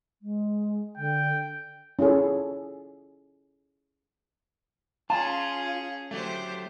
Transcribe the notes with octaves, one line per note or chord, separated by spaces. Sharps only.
G#3
D3 G5
C#4 E4 F4 G#4 A4
C#4 F4 G#4 A5
F#3 A3 G4 C5